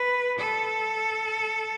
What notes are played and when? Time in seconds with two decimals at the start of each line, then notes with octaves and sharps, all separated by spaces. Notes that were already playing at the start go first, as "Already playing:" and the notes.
Already playing: B4
0.38 A4